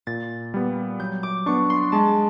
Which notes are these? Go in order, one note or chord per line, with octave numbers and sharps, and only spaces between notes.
A#2 A6
G3 B3
F#3 G6
D6
B3 D4 C#6
C6
G#3 A5